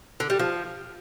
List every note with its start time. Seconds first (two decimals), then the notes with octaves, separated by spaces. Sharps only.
0.20 D3
0.30 G3
0.39 F3